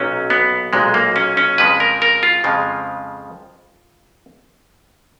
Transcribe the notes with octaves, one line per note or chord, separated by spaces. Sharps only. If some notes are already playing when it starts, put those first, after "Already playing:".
Already playing: B1 A#2 F#3 C#4
B3
B1 A#2 F#3 G#3
A#3
C#4
C#4
F2 C#3 F3 G#3 B4
A#4
A#4
F4
F2 C#3 F3 G#3